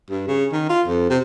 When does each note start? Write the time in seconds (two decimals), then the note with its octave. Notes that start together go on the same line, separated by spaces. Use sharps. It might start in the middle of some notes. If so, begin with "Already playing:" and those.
0.10 G2
0.28 C#3
0.52 D#3
0.70 F4
0.88 F2
1.10 C3